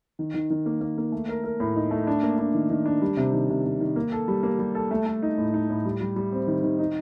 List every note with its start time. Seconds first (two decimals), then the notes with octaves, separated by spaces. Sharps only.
0.19 D#3
0.34 D#3
0.50 D#3
0.66 A#3
0.81 A#3
0.98 A#3
1.12 A3
1.29 A#4
1.44 A#4
1.60 A2
1.76 D#4
1.91 A3
2.07 D4
2.23 A#3
2.39 D4
2.54 D#3
2.70 D#3
2.86 D4
3.02 G3
3.17 C3
3.33 D#3
3.49 C3
3.65 C3
3.80 D#3
3.96 A#3
4.12 A4
4.28 G3
4.43 A#3
4.59 G3
4.75 A4
4.91 A3
5.06 A3
5.22 D#4
5.38 A2
5.54 D#4
5.70 A2
5.85 G3
6.01 G3
6.16 G3
6.32 C4
6.47 D#3
6.63 D#3
6.79 D#4